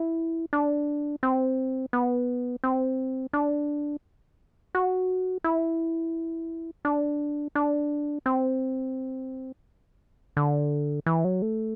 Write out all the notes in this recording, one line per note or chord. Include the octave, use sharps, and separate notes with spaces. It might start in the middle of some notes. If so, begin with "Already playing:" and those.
Already playing: E4
D4
C4
B3
C4
D4
F#4
E4
D4
D4
C4
D3
E3
F#3
A3